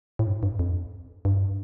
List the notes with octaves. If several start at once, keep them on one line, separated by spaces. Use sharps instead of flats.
A2
G2
G2
F2
G2